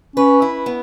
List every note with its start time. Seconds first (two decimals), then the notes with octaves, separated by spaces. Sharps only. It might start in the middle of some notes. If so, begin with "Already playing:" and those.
0.16 C#4 B4
0.42 E4
0.66 B3